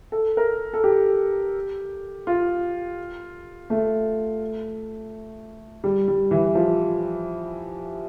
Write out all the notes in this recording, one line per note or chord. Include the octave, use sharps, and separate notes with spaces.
A4
A#4
A4
G4
F4
A3
G3
G3
E3
F3